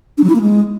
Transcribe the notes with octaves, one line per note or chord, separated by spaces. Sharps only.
D4
F#3
E4
A#3
G#3